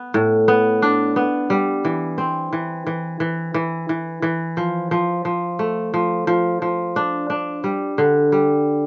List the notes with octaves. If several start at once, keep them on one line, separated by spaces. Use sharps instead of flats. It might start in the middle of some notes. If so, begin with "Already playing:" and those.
Already playing: B3
A2
B3
D4
B3
G3
E3
C4
E3
E3
E3
E3
E3
E3
F3
F3
F3
A3
F3
F3
F3
D4
D4
G3
D3
G3